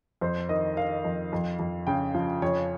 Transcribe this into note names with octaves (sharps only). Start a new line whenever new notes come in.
F2 C5
D#3 D#5
D#3 F5
F2
F2
F2
C#3 G5
F3 F5
F2 C#5